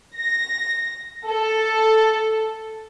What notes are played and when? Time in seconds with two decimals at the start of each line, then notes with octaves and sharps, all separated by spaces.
0.18 A#6
1.27 A4